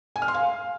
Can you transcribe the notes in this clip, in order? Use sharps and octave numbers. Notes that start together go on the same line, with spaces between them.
G#5
F6
C6
F5